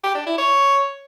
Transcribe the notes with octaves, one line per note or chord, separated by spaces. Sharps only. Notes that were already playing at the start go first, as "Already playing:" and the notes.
G4
D4
E4
C#5